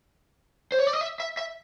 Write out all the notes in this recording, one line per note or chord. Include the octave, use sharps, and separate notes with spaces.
C5
C#5
D5
D#5
E5
E5
E5